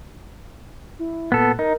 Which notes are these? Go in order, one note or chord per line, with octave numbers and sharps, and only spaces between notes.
E4
A#2 B3 A4
D#4 A#4